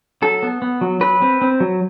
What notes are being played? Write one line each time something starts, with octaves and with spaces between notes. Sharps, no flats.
F#3 A4
B3
B3
F#3
F#3 B4
C4
C4
F#3